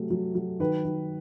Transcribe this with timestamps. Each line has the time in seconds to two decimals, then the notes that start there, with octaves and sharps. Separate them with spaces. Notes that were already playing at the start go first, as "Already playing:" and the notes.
Already playing: C3 F#3 A3
0.10 F#3
0.35 F#3
0.60 D#3 B4
0.85 D#3